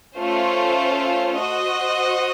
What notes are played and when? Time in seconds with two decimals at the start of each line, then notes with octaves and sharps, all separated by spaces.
0.17 A3 C#4 F4 C5
1.39 F#4 C5 D#5